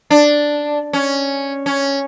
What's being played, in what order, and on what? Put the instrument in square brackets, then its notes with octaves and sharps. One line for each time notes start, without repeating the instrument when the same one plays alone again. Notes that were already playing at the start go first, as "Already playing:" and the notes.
[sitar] D4
C#4
C#4